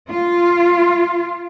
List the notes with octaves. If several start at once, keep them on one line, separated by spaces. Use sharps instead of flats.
F4